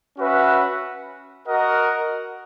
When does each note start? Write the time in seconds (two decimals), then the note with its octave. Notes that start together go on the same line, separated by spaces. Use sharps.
0.18 C#4 F#4 B4 E5
1.47 F#4 A#4 D#5 F#5